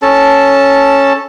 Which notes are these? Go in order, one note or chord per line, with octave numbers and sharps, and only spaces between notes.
C#4 A4 A5